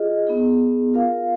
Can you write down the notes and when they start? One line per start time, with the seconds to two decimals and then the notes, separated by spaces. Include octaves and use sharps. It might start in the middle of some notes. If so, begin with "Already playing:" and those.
Already playing: F4 G#4 D#5
0.27 B3 D#4 G#4
0.94 F4 A#4 F5